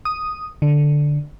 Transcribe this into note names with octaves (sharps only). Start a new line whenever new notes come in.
D#6
D3